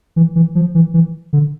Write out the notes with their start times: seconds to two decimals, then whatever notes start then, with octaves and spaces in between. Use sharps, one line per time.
0.16 E3
0.36 E3
0.55 F3
0.75 E3
0.94 E3
1.33 D3